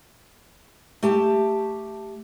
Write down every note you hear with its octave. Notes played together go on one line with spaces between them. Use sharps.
A3 G4 A5